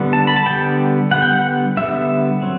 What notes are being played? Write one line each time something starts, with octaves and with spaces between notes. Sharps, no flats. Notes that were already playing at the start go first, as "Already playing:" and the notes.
Already playing: D3 G3 B3
A5
B5
A5
D3 G3 B3 G5
D3 G3 B3 F#5
G5
F#5
D3 G3 B3 E5
F#3 C4